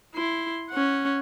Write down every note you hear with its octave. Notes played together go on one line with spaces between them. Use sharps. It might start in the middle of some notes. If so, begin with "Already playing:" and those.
E4 C6
C#4 F#5